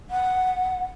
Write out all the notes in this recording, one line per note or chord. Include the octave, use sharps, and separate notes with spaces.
F#5